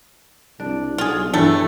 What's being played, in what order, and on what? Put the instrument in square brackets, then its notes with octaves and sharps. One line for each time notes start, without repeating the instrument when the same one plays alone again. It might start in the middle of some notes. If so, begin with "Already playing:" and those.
[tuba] C2 [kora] D4
[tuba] B1 [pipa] F4 G#4
[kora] G2 C#4 E4 [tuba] E3 [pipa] A3 A4